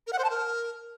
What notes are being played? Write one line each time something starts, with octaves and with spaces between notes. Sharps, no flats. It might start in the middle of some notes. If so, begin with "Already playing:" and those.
A#4
F#5
C5
A5
A#4